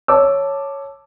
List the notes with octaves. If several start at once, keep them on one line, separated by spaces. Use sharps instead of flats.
C#5 A5 D6 E6